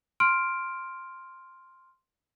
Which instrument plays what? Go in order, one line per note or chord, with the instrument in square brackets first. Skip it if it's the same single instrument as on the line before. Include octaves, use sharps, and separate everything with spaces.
[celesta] C6 F6 D7